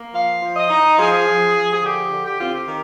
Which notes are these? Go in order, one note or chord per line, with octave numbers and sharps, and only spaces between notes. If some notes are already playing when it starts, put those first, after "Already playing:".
Already playing: A#3
F3 F5
F3
D#5
D#4
F3 G#4
F3
F3
G#4
D3 G4
D3
G4
C4 F4
G4
D#3